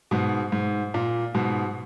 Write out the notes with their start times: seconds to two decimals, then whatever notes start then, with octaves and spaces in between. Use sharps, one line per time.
0.11 G#2 B2
0.52 G#2
0.94 A#2
1.34 G#2 B2